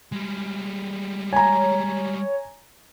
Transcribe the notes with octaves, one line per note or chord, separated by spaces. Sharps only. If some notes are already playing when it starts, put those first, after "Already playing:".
G3 G#3
C#5 G#5 A#5